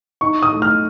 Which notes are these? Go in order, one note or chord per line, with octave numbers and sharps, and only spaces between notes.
D#4 C#6
D#6
A3
F6